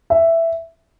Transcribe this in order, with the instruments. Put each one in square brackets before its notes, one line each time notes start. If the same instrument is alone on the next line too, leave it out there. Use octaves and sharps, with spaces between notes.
[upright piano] E5